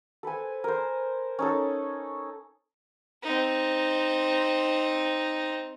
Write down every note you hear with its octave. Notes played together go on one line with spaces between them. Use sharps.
A4 B4 C5 G#5
A#4 C5
C#4 D#4 A4
C4 D#4